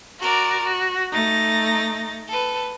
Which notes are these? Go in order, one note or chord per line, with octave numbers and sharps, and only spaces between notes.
F#4 A#4 D5
F#4
A3 D#4 A6 A#6
A4 B4